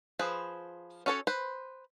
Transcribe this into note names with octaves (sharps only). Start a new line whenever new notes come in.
F3 G#4 B4 C5
C#4 F#4 A4 B4 C#5
B4 C5